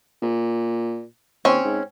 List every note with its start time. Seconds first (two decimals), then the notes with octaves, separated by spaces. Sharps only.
0.22 A#2
1.45 D#2 C4 C#4 C#5
1.65 G#2